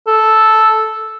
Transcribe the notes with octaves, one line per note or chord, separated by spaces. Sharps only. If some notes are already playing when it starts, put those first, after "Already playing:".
A4